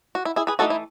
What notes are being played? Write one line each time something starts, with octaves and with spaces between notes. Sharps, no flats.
F#4
E4
E4 G#4
G#4 B4
E3 A3 D#4 F#4 A4
E4